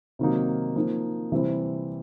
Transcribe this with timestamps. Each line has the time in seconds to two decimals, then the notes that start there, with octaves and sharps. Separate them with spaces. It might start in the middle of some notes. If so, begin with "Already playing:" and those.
0.19 C3 D#3 F#3 A#3 D#4
0.76 F3 A#3 D#4
1.32 C3 E3 G3 C4 E4